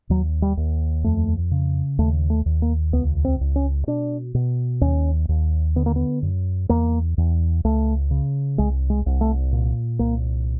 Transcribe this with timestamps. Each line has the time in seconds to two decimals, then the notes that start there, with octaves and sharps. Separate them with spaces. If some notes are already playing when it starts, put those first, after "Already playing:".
0.10 D#2 F#3
0.42 G3
0.57 D#2
1.04 F2 A3
1.51 C#3
1.98 D#2 A3
2.30 A3
2.46 D#2
2.62 A#3
2.93 C#2 B3
3.25 C4
3.41 C#2
3.56 C#4
3.87 B2 D4
4.34 B2
4.81 D#2 C#4
5.29 D#2
5.76 D3 B3
5.86 A#3
5.96 B3
6.22 F#2
6.69 E2 A#3
7.18 E2
7.64 C#2 A3
8.11 C#3
8.58 C2 G#3
8.90 G#3
9.06 C2
9.21 A3
9.52 A#2
9.99 C2 A#3